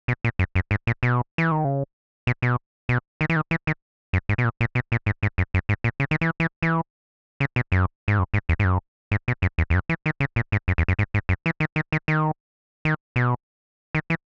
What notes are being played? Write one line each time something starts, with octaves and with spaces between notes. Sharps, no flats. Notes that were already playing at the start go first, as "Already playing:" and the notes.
B2
A#2
F#2
F#2
G#2
A#2
B2
E3
D#3
C#3
B2
B2
B2
D#3
E3
D#3
E3
D#3
F#2
G#2
B2
A#2
A#2
B2
A#2
G#2
G#2
F#2
F#2
G#2
A#2
C#3
D#3
E3
E3
E3
C#3
B2
F#2
G#2
F#2
G#2
E2
G#2
F#2
G#2
B2
F#2
E2
E2
F#2
E3
D#3
C#3
A#2
G#2
F#2
E2
F#2
G#2
G#2
F#2
E3
D#3
D#3
D#3
D#3
D#3
B2
D#3
E3